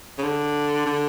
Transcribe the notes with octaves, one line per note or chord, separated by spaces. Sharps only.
C#3
D3
D3